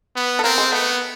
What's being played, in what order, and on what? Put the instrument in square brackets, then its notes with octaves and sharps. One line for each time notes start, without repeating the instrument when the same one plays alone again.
[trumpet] B3
[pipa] A4
[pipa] A#3 A#4 [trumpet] C4
[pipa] G#3 G#4
[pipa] A3 A4 [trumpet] B3